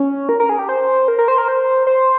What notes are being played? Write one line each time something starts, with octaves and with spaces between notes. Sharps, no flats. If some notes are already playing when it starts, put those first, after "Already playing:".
Already playing: C#4
A#4
A#4
G#4
G4
C5
A#4
A#4
C5
A#4
C5
C5